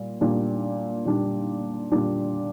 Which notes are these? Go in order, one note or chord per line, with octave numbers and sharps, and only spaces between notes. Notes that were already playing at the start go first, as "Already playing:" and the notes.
Already playing: A#2 G3
A#2 G3 D4
A#2 G3 D4
A#2 G3 D4